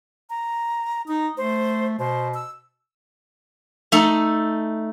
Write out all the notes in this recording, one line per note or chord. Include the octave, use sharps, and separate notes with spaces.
A#5
D#4 A#5
A3 C5
B2 C5
E6
A3 D#4 A4